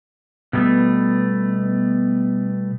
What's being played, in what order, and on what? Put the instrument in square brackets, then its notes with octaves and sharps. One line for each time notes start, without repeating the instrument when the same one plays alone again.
[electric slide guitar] B2 G3 A3 B3